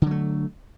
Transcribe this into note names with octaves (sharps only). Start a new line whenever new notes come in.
D3 F#3 A3